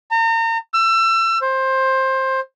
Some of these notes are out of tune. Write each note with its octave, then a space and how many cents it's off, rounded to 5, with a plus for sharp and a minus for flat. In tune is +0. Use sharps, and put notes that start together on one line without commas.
A#5 -40
E6 +30
C5 +15